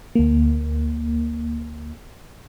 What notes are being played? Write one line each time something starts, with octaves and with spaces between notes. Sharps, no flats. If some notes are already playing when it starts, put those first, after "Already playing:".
D2 A#3